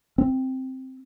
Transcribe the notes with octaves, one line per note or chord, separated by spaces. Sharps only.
C4